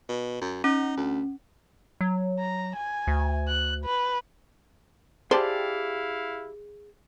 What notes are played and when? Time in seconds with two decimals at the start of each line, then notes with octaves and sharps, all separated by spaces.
0.09 B2
0.41 F#2
0.64 C#4 D#4
0.97 D2
2.01 F#3
2.39 A#5
2.76 G#5
3.07 D2
3.48 F#6
3.85 B4
5.31 E4 G4 G#4 C5 D5 F5 G5 A5